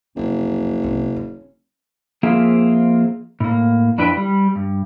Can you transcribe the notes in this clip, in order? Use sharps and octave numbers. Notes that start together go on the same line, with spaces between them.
F#1 C2 F2
C2 G#2
C#4
F3 A#3 C4 F4 G#4 E5
A2 A#3
F2 D4 E4 B4 E5 G5
G3
G2